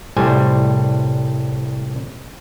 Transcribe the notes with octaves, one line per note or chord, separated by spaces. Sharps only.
C2 A2 G3 C5 G#5